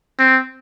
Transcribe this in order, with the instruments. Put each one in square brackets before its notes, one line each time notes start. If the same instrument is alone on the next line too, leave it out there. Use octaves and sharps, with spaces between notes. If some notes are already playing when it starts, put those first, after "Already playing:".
[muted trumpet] C4